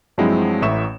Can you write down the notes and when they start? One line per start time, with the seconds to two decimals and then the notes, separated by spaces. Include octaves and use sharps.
0.18 G2 F3 F#3 G#3 C4 E4
0.62 A1 A2 E5 C#6 E7